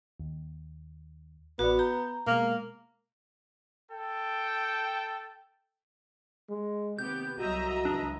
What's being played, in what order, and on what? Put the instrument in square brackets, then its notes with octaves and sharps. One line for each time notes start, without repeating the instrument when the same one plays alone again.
[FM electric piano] D#2
[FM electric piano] A1 D5 [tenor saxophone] B3 [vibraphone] F#4
[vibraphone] A#5 [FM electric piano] G6
[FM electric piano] B2 G#3 [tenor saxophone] A#3
[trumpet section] A4 G5
[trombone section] G#3
[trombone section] D#2 C3 [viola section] B3 G4 [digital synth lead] G6
[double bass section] C2 F#3 [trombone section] F#4 [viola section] D#5 E5 A#5
[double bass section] C#2 E3 [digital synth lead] D4